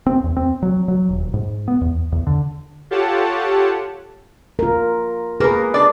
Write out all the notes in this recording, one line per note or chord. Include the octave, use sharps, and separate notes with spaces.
C4
E2
C4
F#3
F#3
D#1
G#2
B3
E2
E2
D3
F4 G4 A4 C#5 F#5 A5
F4 A#4
A#3 G#4 A#4 B4
D4 D5